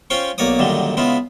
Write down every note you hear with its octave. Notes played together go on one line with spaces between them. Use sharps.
C#4 F4 C5 C#5 G5 C#6
B1 A#3 C#5 D5 D#6
F#2 A#2 D3 D#3 G3
C#3 G#3 B3 E4 F4